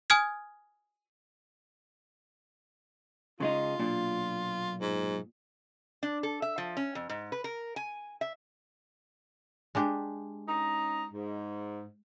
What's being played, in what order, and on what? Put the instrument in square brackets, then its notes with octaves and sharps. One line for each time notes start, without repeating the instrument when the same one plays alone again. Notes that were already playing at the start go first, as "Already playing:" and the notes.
[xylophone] G#5 D#6 F6 G#6
[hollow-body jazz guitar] C#3 G#3 D#4 [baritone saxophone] F4
[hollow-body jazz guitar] B1 A#2 D4
[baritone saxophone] G#2
[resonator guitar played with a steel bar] D4
A4
E5
F3
C#4
F2
G#2
B4
A#4
G#5
E5
[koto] G#3 D4 G4
[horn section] C#4 D#4 A#5
G#2